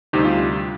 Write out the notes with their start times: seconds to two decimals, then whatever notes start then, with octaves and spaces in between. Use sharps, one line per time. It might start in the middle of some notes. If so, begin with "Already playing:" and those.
0.13 D2 C3 G3 C4 D#4 G4
0.24 F4